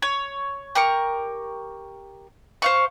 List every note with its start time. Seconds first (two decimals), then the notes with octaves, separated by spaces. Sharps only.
0.02 C#5
0.75 G4 A#4 C#6
2.62 C5 F5 C#6